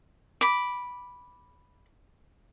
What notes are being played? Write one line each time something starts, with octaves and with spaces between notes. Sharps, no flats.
B5 D6